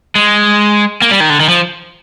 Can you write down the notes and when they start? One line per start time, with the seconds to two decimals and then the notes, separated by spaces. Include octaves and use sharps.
0.15 G#3
1.02 A#3
1.11 G3
1.20 D#3
1.30 D3
1.40 D#3
1.49 F3